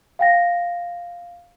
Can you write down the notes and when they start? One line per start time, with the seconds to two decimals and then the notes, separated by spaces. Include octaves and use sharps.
0.19 F5 G5 A#6